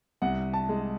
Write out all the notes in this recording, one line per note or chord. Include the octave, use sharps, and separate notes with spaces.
C2 F#5
A5
G#3